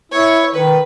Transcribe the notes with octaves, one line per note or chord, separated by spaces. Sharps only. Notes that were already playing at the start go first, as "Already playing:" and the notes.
E4 C#5
D#3 B4